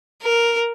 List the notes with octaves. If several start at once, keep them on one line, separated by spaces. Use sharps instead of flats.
A#4